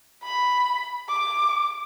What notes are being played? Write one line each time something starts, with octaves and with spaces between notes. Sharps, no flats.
B5
D6